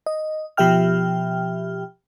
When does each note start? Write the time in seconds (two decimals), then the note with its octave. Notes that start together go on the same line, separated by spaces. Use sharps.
0.06 D#5
0.57 B2 F3 G4 E5 G5 F6